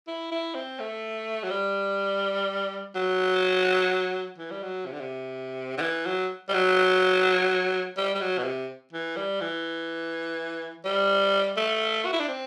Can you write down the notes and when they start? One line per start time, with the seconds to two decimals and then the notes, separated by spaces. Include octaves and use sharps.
0.07 E4
0.31 E4
0.55 C4
0.80 A3
1.43 F#3
1.50 G3
2.95 F#3
4.38 E3
4.51 G3
4.63 F#3
4.86 C3
4.93 D3
5.00 C3
5.78 D3
5.81 E3
6.06 F#3
6.49 G3
6.54 F#3
7.97 G3
8.15 G3
8.21 F#3
8.38 B2
8.45 C3
8.93 E3
9.17 G3
9.41 E3
10.85 G3
11.57 A3
12.05 F#4
12.13 E4
12.20 D4
12.28 C4